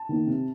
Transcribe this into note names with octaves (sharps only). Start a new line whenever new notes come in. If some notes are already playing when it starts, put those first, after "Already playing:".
Already playing: A5
D#3 A#3
C3